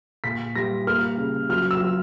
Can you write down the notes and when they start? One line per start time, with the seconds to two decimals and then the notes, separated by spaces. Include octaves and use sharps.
0.24 A#2 B6
0.56 G3 A#6
0.87 A#3 F6
1.18 C#3
1.49 F#3 F6
1.71 E6
1.80 F#3